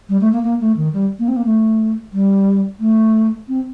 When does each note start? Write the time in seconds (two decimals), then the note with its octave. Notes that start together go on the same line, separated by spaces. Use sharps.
0.09 G3
0.21 A3
0.33 A#3
0.43 A#3
0.60 A3
0.77 D#3
0.93 G3
1.19 A#3
1.28 C4
1.36 A#3
1.45 A3
2.13 G3
2.80 A3
3.48 C4